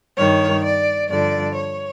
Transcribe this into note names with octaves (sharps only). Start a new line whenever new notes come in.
G2 D#3 C#5
D5
G2 D3 F3 D5
C#5